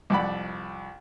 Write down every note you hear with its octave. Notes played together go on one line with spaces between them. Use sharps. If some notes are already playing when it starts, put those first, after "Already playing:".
C2 F2 D5 F#5 B5